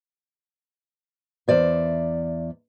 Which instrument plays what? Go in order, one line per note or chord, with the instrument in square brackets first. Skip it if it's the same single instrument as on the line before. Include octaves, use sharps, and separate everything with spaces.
[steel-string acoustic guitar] E2 C5 D5 E5